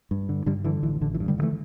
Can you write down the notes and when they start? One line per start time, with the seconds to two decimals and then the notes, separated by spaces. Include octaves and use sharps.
0.11 G2
0.29 D3
0.46 G2 D3 G3
0.64 D3 E3
0.83 A1 E3
1.01 A1 D3
1.14 E3
1.20 G2
1.28 D3 G3
1.38 D3 E3 A3